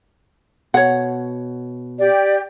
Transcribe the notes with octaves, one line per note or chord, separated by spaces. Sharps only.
B2 C#5 F#5
G4 D5